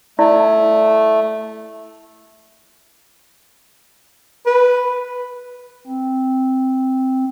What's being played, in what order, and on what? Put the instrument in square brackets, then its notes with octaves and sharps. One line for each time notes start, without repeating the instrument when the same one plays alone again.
[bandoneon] A3 [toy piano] E4 D5
[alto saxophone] B4
[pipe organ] C4